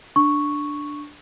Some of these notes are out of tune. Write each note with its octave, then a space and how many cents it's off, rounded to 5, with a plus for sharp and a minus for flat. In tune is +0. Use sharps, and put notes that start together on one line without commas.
D4 +5 C#6 +0